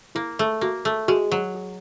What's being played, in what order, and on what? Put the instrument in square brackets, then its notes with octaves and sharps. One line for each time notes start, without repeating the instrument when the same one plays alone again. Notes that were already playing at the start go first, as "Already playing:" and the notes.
[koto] A#3 [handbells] E4
[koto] A3
[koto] A#3 [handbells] F#4
[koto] A3
[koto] G#3 [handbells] F#4
[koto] F#3
[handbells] G#4